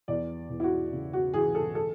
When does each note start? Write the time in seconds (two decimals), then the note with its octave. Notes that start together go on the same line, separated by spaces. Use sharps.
0.08 E2 D5
0.50 E2
0.60 E4
0.64 F#4
0.92 C#3
1.13 F#4
1.34 E3 G#4
1.55 A4
1.75 A4